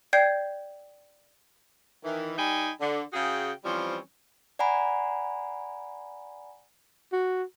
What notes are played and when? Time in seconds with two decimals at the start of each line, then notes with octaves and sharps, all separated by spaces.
0.13 D5 G5 G6 G#6 C7
2.04 D#3 E3
2.38 G3 D#4 G5 G#5 B5
2.81 D3
3.13 C#3 F#4 G#4 G5
3.64 E3 F3 G3 C4 C#4
4.59 D5 F#5 G#5 A#5 B5
7.12 F#4